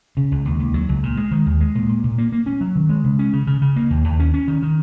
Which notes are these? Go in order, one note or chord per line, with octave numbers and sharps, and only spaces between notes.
C#3
C#2
D#2
D#2
F#3
C#2
A#2
G#3
D#3
D#2
G#3
A#2
A#2
A#2
A#3
A#3
C#4
F#3
D#3
G#3
C#3
C#4
C#3
C#3
C#3
A#3
D#2
D#2
C#4
C#4
D#3
D#3